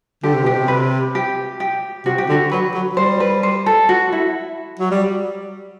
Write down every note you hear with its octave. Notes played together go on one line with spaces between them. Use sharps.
D3 G4
C3
B2 G4
C3
B4
G4
G4
C3 F#4
G4
D3 F#4
F#3 B4
F#3
G3 C5
B4
C5
A4
F#4
E4
F#3
G3